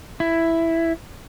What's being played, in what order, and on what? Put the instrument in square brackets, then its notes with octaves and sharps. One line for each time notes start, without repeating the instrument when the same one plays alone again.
[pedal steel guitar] E4